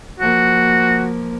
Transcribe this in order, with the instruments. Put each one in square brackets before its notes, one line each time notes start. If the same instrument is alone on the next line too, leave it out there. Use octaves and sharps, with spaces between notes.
[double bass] F3 A#3 [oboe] F#4